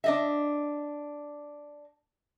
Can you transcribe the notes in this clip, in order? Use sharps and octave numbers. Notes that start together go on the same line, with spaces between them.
D4 D#5 E5